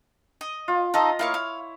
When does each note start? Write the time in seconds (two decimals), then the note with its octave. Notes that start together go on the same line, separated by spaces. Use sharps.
0.41 D#5
0.68 F4
0.94 D#4 F4 A4 D#5 D#6
1.19 A#3 E4 C#5 F5 C#6
1.34 F5